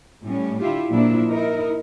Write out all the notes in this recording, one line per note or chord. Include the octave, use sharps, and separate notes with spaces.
A2 G3 C#4
D3 E4 F4 G4
A#2 F3 A#3 D4 E4
D#4 E4 A#4